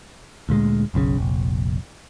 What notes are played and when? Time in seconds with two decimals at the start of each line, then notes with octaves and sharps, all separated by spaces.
0.49 D2 A#2 G3 G#3
0.94 F#1 B1 A2 C#3
1.18 F1 A#1